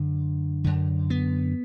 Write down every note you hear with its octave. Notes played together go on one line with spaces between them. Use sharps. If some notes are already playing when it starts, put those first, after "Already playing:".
Already playing: F#2 D3
F#2 D3
B3